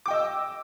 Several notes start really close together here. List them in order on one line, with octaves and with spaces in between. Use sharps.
D6 G5 D#5 E6